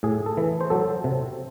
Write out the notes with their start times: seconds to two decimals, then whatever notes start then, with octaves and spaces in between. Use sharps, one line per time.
0.03 A2 G#4
0.26 A4
0.37 E3
0.61 C5
0.70 F#3 A4
1.04 C3